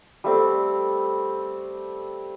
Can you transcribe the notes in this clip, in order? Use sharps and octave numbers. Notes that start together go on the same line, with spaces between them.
G3 A3 C4